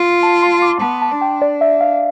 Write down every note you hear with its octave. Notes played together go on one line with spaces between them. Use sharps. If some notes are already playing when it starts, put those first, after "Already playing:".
Already playing: F4
A5
C6
D6
B3 A5
A5
D4
G5
D5
E5
F5